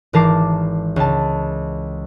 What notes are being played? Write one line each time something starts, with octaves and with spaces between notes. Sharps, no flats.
G#1 E3 A#4 A5 D6 C7
C#2 A5